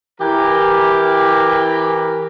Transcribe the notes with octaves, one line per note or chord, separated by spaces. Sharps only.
E3 G4 A#4